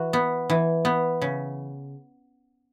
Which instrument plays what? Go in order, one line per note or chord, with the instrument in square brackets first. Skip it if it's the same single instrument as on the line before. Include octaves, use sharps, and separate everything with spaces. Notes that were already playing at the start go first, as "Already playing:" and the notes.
Already playing: [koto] E3 F#4
B3
E3
B3
C#3